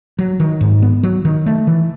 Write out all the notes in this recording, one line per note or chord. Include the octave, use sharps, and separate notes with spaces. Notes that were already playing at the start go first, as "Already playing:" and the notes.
F#3
D#3
G#2
B3
F#3
D#3
A3
E3